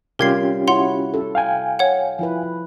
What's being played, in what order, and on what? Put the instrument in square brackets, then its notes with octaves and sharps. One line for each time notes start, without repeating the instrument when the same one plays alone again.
[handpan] C3 G3 [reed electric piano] C#4 F4 G4 [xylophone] A#4 G#6 C7
[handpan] E4 F#4 C#5 [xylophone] F#5 C6 F7
[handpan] A4
[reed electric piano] F5 G5 G#5
[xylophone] C#5 F#5
[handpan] F3 E4 B4